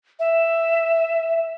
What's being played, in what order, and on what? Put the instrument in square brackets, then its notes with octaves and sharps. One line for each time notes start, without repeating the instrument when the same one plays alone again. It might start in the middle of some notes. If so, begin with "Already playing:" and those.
[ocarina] E5